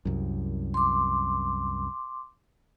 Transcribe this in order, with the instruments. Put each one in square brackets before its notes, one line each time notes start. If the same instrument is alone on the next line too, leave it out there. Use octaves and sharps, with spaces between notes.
[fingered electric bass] C2 F#2
[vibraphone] C6 D6